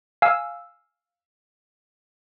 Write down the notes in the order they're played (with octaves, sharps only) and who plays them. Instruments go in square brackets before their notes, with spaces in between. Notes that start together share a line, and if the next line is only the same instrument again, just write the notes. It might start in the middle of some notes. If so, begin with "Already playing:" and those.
[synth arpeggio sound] F5 G#5 E6